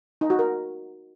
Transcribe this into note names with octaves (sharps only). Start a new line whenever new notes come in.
D#4
F#4
A#4